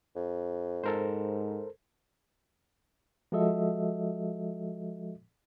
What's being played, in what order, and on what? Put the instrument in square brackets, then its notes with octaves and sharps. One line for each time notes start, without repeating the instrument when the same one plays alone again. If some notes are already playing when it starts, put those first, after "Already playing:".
[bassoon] F2
[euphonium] G#2 [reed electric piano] A4 A#4 C5
[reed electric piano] F3 G#3 F#4 A4 D#5 E5